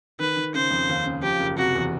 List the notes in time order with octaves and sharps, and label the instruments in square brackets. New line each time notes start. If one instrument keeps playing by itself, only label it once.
[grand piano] D#3 [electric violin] B4
[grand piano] D#3
[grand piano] C#3 [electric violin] C5
[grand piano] F2
D#2
C#3
[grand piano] F3 [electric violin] G4
[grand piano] F#1
[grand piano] C3 [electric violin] F#4
[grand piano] E2